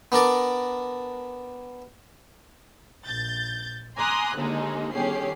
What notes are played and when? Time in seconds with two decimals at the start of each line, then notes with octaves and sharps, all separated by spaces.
0.12 B3 D4 A#4 D5
3.06 A#1 G6 A6
3.97 G#5 A#5 C6 D6 D#6 F#6
4.36 D#2 D3 G#3 A#3 D#4
4.93 G1 D#3 C#4 G4 G#4 C7